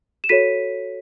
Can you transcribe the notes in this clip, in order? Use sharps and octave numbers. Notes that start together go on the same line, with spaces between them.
E7
F#4 A4 C#5 B6 D#7